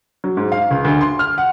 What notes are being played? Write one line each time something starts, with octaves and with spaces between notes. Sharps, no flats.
F#3
G#2
F5
C#2
D2
C6
F6
F#5